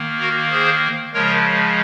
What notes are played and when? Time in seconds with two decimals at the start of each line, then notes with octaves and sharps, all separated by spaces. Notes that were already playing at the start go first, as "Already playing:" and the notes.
Already playing: D#3 A#3
0.19 F#4 A#4
0.51 G#4 C5
1.13 C#3 F3 G#3 A#4 C#5